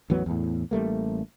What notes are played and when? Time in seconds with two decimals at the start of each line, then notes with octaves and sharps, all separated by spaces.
0.10 A1 E2 F#3 B3
0.26 E2 A2
0.71 A1 G3 A3 A#3